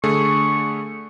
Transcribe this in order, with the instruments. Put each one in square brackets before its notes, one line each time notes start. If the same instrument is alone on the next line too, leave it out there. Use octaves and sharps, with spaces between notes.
[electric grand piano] D3 A3 G#4 [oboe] C#6